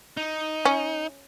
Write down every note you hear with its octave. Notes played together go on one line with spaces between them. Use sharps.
D#4
C#4